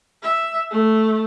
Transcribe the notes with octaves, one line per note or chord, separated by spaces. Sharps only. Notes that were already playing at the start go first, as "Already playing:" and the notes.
E5
A3